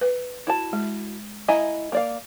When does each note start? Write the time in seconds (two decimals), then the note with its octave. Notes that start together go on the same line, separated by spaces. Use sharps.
0.01 B4
0.47 E4 F#4 A5
0.73 G#3
1.48 E4 D#5 E5 G#5 A#5
1.92 A#3 D5 F5